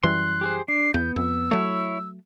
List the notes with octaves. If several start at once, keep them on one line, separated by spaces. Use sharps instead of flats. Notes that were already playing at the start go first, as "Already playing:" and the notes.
F#2 E3 G3 C6 F#6
G4 G#4 C5
D4 C7
E2 B3 G6
F2 E6
F#3 A3 E4 C#5